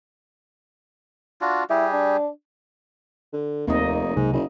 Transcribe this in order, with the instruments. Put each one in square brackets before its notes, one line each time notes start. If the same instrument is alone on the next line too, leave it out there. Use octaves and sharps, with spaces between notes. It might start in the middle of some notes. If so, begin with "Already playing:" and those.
[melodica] D4 F4 F#4
[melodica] G3 G4 G#4 [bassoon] E4
[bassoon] D4
[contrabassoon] D3
[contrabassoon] F1 [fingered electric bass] D#2 C4 D4 [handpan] A#3 D#4 D#5
[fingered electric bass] C2 C3 F#3 [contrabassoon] G#2
[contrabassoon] F#1